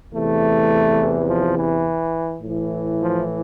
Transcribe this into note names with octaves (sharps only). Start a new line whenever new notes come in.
E2 C3 E3 A3
F3
E3
A2 E3
F3